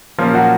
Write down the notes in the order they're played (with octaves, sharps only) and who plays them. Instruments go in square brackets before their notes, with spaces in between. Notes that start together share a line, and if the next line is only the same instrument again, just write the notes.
[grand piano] A#2 F3 A#3 C#4 F4
F#3 F#4